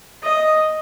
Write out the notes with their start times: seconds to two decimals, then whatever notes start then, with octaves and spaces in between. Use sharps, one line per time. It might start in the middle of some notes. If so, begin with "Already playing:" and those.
0.23 D#5